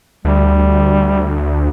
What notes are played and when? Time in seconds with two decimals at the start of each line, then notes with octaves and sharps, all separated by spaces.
0.25 D2 G3